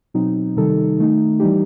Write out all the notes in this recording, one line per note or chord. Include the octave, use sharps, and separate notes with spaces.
B2 F#3 C4 D#4
C3 D#3 G3 D#4 A4
D#3 A3 D#4
E3 G3 D#4 G4